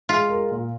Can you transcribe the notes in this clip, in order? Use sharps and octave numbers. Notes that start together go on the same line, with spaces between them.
G#3 F4
A#4
A#2